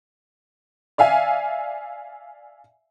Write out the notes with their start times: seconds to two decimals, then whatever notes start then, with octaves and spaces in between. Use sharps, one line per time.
0.98 D5 E5 F5 G#5